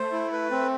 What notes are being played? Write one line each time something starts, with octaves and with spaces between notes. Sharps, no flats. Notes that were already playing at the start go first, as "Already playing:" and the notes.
Already playing: A3 C5
E4
B4
C4